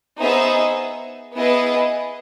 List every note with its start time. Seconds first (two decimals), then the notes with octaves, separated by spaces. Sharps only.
0.20 B3 D#4 G#4 C5 E5
1.35 B3 E4 G#4 B4 D#5